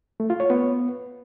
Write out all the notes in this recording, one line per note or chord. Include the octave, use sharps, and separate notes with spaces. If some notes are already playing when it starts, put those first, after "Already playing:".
A3
F4
C#5
B3